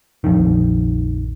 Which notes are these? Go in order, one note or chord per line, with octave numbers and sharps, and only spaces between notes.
A#1 F2 D#3